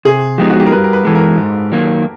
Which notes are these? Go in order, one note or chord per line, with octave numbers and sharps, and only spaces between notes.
C3 G#4
F3 G#3 B3 D#4 G4
F#4
G4
A#4
G2 B4
A#4
B4
E3 G#3 A4
A#4
G#2
D#3 F#3 A#3